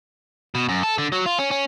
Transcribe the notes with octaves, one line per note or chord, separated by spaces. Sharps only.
B2
F#2
A4
D3
F#3
F4
C#4
C#4